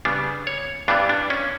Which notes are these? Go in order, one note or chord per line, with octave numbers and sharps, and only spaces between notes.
C#3 G3 B3 D4
C#5
G2 E3 G3 B3 D4
D4
C#4